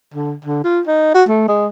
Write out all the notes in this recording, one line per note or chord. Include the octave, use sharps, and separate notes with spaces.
D3
D3
F4
D#4
F#4
A3
G#3